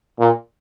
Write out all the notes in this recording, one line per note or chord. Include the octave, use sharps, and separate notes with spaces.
A#2